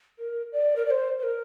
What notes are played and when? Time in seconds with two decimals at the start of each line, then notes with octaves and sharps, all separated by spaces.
0.19 A#4
0.52 D5
0.76 A#4
0.85 D5
0.90 C5
1.19 C5
1.23 A#4